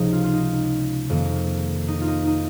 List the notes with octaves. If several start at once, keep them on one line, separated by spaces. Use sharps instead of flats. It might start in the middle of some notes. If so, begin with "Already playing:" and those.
Already playing: C#2 C3 F3 G#3 D#4
F4
F4
D#4
F2 D#3 A#3
D#4
F4
D#4
D#4